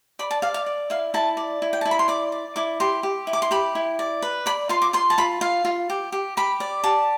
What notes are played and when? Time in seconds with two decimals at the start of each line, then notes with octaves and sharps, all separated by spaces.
0.19 D5 B5
0.31 A5
0.42 D5 F5
0.54 F5
0.66 D5
0.90 E4 F5
1.14 E4 A5
1.37 D5
1.62 E4
1.73 G5
1.81 A5
1.85 E4
1.91 B5
1.99 C6
2.08 D5 D6
2.32 D5
2.56 E4 D6
2.80 G4 C6
3.03 G4
3.27 E4
3.33 D6
3.42 C6
3.51 G4 B5
3.75 E4
3.99 D5
4.22 B4
4.46 D5 B5
4.69 F4 C6
4.82 D6
4.93 F4 C6
5.10 A5
5.18 F4 B5
5.41 F4 F5
5.65 F4
5.90 G4
6.12 G4
6.37 G4 B5
6.60 D5
6.84 G4 A5